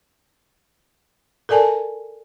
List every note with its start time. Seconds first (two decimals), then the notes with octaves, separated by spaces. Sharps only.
1.49 A4 A#4 D5 G#5 A5